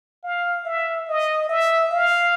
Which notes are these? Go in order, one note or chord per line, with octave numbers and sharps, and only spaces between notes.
F5
E5
D#5
E5
F5